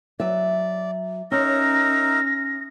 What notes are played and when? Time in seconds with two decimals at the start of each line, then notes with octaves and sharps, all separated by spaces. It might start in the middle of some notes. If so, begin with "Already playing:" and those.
0.20 F#3 D5 E5
1.32 C#4 D#4 A#4 E5 A#6